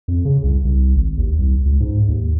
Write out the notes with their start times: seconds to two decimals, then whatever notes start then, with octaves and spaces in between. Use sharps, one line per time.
0.08 F2
0.25 C#3
0.43 C2
0.65 C2
0.96 G#1
1.17 D#2
1.39 C2
1.65 C#2
1.80 G#2
2.09 D#2